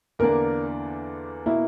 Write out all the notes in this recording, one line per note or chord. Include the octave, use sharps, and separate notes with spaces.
E2 D3 A#3 D4 A#4
B2 A#3 E4